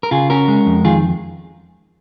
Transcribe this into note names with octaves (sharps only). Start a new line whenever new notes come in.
A#4
C#3 F4 G#4
C#4 F#4 A#4
G#3
F2
D#3 F4 G#4